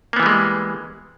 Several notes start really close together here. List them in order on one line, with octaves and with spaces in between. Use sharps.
A#3 B3 E3 G3 G#3